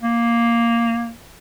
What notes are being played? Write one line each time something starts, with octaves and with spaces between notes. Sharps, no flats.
A#3